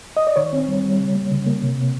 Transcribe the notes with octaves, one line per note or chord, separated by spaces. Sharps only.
D#5
D5
D#3 C#5
C4
G3
G3
C#3
A#3
C#3
A#3
C3
C3